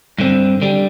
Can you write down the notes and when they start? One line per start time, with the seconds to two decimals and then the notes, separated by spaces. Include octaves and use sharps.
0.18 G2 D3 C4
0.62 D3 G3